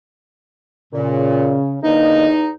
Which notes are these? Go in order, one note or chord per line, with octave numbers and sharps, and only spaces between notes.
A#2 C#3
E2 D3 A#3 D#4 D#5